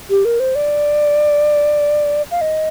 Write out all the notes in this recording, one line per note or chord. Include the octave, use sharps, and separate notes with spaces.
G4
A#4
C5
D5
F5
D#5